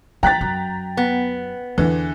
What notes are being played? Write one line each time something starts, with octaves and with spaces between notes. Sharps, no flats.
F3 G5 A#5 F#6 A6 B6
F#2
B3
E2 D3 E3